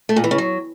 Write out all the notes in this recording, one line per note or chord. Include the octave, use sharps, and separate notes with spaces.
A3
A#2
E3
C#3
F#3